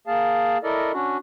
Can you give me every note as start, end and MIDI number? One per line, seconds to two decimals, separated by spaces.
0.07 0.58 58
0.07 0.58 68
0.07 0.58 77
0.07 0.58 81
0.64 0.92 64
0.64 0.92 69
0.64 0.92 70
0.64 0.92 74
0.64 0.92 75
0.93 1.17 61
0.93 1.17 62
0.93 1.17 66